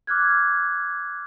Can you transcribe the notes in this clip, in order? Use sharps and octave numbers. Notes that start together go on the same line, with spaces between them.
D6 F6 F#6 G#6